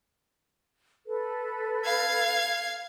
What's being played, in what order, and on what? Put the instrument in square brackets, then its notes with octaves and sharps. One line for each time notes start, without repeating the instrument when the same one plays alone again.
[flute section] A4 B4
[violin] F5 G#6